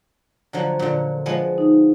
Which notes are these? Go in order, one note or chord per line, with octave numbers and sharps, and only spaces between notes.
D3 F3 F#3
A#2 D3
F3 G#3 B3
D#4